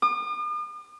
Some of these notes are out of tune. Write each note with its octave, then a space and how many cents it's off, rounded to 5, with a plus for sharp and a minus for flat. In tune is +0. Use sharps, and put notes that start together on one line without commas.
D#6 -45